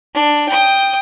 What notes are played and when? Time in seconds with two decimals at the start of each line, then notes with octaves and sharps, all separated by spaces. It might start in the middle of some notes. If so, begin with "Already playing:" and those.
0.14 D4
0.49 G5 D#6